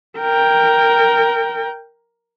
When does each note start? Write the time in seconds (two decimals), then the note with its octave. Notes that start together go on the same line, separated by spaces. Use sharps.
0.18 A#4 G5